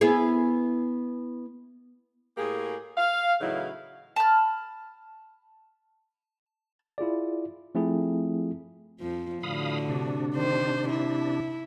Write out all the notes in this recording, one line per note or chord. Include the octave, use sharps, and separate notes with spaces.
B3 E4 G#4
A2 A#3 G4 G#4
F5
A2 C#3 E3 F#3 D#4 E4
A5 B5 F6
E4 F4 G#4 D5
F3 A3 C4 E4 G#4
F2 F3
A2 D3 F#4 F5 B5 D#6
C3 D4
D#3 C5
E4